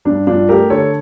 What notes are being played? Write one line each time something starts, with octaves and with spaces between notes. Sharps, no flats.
G2 D4
G2 D4 F4
A3 G4 A#4
D3 A4 C#5